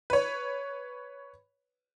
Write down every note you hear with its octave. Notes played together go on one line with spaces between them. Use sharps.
B4 C#5